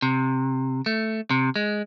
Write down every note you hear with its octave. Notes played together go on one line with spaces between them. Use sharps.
C3
A3
C3
G#3